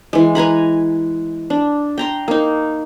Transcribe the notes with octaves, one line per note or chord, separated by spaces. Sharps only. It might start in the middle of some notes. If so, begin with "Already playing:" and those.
E3 G#3
B4 G#5 A#5 B5
D4
G5 A#5 C6
A#3 D#4